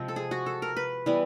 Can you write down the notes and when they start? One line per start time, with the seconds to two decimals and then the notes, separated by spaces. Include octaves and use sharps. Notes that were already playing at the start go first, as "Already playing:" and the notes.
Already playing: C3 F3 G#3 C4
0.08 A4
0.16 G#4
0.31 F#4
0.46 A4
0.62 A#4
0.76 B4
1.06 E3 G3 B3